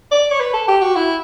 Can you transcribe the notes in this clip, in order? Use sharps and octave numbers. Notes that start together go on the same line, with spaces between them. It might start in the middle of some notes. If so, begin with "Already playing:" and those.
D5
C#5
B4
A4
G4
F#4
E4